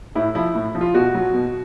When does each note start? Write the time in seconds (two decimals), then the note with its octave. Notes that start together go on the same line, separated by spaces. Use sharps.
0.15 A2 E4
0.35 F3 E4
0.55 A2
0.75 F3
0.81 F4
0.94 B2 F#4
1.14 F#3
1.34 B2